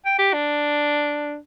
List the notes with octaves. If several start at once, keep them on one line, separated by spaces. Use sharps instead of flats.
G5
G4
D4